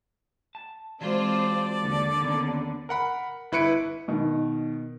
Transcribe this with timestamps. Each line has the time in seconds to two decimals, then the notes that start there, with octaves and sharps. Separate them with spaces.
0.55 A5
1.01 E3 F#3 G#3 C4 F4 C5 D5 A5
1.81 D#2 D3
2.22 D#3 B3 C#4
2.89 A#4 F#5 B5
3.52 G1 E4 B4 C#7 D7
4.08 B2 D#3